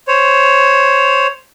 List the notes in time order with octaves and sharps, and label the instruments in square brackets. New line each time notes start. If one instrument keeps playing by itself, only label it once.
[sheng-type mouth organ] C5 C#5